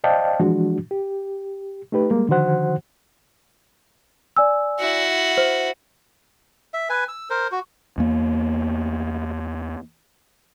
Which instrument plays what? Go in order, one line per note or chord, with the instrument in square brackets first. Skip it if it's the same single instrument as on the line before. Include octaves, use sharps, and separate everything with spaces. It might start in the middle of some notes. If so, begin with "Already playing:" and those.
[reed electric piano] C5 D5 D#5 F5 G5 A5
E3 F3 G#3 D4 F#4
G4
A3 D#4 G4 B4
G3 G#3 A#3
D3 D#3 F3 F#4 C5 F#5
[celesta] D5 G#5 E6
[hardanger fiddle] E4 F#4
[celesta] C5
[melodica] E5
B4 G#5
E6
A#4 C5
F#4
[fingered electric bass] E2 A#3